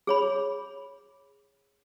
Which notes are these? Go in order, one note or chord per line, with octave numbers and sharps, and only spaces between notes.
G#4 C#5 B5